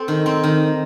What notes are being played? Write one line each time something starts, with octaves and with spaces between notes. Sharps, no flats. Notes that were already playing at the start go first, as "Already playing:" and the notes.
Already playing: C4 A4
D#3
C4
D#3